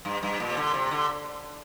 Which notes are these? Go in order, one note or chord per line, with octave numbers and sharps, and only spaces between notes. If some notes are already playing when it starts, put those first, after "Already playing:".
G2
G2
A#2
C3
D3
C3
D3